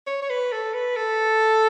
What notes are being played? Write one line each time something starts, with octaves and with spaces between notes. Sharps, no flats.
C#5
C#5
B4
A4
B4
A4